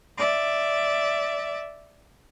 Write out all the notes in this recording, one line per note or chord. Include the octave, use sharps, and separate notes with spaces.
D5 E5